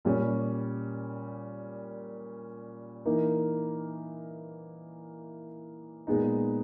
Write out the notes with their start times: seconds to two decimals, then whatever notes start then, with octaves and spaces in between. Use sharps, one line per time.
0.05 A#2 G3 C#4
3.05 E3 A#3 D#4 A#4
6.07 A#2 G#3 B3 D#4